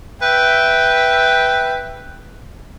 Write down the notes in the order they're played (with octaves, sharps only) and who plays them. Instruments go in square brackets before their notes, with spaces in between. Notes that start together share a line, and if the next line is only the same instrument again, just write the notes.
[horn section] B4 E5 G5